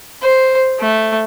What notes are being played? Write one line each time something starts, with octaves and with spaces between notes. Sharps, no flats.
C5
A3